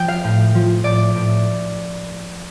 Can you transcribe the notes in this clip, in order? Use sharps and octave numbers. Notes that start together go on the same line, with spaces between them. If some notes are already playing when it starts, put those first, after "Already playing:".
Already playing: F3 G5
F5
A2
F3
A2 D5
A2